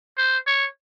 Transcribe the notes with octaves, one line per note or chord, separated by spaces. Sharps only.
C5
C#5